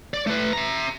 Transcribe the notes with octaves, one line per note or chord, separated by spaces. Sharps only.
D5
A3 B4
E5 A#5